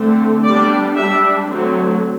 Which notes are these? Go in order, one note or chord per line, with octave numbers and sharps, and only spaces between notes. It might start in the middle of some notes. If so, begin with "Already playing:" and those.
Already playing: D3 A3 C4
G3 B3 D4 D5
G3 D4 E5
D3 F#3 A3 C4